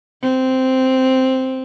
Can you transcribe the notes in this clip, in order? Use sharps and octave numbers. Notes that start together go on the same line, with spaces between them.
C4